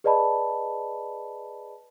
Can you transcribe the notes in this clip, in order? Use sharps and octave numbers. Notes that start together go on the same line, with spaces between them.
G#4 B4 D5 D#5 A5 B5